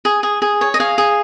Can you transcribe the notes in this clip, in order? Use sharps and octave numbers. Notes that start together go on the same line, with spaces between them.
G#4
G#4
G#4
C#5
D#5
G#4 F5
G#4